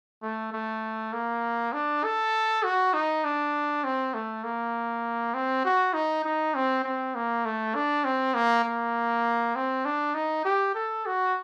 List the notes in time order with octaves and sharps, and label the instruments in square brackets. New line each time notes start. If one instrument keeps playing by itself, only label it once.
[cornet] A3
A3
A#3
D4
A4
F#4
D#4
D4
C4
A3
A#3
C4
F#4
D#4
D#4
C4
C4
A#3
A3
D4
C4
A#3
A#3
C4
D4
D#4
G4
A4
F#4